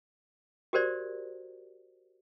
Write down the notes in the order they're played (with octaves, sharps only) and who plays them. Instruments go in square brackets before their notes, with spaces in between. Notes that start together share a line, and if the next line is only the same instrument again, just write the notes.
[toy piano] F#4 G4 A#4 C5 D5